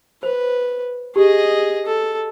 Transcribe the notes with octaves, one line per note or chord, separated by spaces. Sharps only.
B4 C5
G4 G#4 D#5
A4